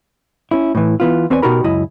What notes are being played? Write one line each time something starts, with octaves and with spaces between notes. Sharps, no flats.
C#4 E4
A2 E3
E3 B3 F4
E2 C4 B4 C#5 D5 G#5
B2 D#4 F#4 G4 A#4 B5
C#2 F#2 E4 D#5